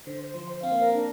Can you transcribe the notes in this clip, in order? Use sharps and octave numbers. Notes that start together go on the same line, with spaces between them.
D3 C5
C5
F3 C6
C5
C4 F5
A#3
C4 A#4
D4